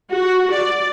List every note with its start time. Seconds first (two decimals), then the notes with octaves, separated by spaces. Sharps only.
0.11 F#4
0.53 D5